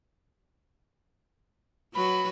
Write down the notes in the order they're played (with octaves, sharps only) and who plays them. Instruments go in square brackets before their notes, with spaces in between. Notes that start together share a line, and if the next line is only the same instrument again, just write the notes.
[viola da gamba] F#3 F#4 B4 [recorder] B5